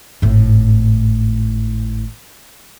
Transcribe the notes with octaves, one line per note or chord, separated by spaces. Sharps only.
G#1 A2